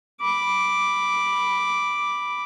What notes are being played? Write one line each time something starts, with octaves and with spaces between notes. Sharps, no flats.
B5 D6